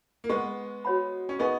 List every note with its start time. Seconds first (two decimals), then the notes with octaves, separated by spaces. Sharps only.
0.24 A#3
0.29 G#3 B3 B4 F#5 C#6
0.85 F#4 C#5 F#5 B5
1.29 C#4
1.39 B3 D#4 G#4 B4 D#5 G#5 C#6